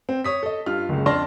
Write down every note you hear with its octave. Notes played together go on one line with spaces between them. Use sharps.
C4
C#5 D#6 B6
A4 D#5
G2 F4 F6
F#1 C#2
F2 D4 A5 C6 F6 A#6